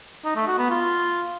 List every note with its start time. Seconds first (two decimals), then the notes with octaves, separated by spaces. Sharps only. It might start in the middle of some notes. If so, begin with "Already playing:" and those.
0.25 D#4
0.36 A3
0.47 F#4
0.58 B3
0.70 F4